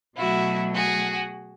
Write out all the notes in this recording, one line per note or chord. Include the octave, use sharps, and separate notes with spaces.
B2 F#3 A3 E4 F#4
F#4 G#4